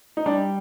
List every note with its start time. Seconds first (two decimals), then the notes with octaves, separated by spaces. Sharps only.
0.17 D#4
0.26 G3 D4